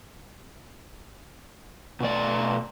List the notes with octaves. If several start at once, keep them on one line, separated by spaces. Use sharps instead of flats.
B2 A3 D5